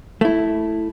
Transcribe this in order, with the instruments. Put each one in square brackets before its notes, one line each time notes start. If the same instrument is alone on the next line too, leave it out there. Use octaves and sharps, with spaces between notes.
[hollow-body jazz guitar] A3 E4